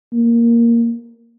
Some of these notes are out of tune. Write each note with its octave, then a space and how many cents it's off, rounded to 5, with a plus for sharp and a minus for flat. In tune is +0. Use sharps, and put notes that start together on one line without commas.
A#3 +0